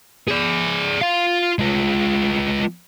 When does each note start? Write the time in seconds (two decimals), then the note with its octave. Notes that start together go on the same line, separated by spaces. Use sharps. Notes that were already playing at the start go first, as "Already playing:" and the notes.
0.28 G#4 D5
1.02 F4 F5
1.59 G#3 F4